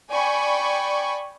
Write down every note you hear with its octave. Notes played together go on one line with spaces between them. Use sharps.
D5 G5 G#5 B5 C#6